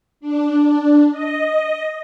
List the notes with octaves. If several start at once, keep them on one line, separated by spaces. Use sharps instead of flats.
D4
D#5